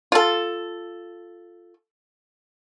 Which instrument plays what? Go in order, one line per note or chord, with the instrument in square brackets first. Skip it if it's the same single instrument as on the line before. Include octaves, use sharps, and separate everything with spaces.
[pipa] F4 A4